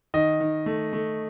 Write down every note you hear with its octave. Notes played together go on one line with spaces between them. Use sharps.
D#3 D#5
D#3
A3
A3